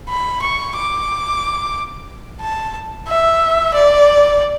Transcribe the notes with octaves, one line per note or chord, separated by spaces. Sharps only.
B5
C#6
D6
A5
E5
D5